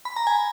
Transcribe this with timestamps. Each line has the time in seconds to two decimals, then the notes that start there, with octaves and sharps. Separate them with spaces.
0.05 B5
0.16 A#5
0.27 G#5